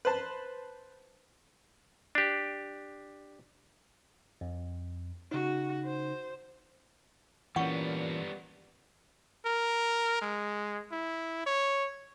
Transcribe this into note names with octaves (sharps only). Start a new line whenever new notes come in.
B4 C5 A5
D4 G4
F2
C#3 D#4 F#4
C5
A#2 E3 G3 B3 C#4 F#5 C#6
A#4
G#3
E4
C#5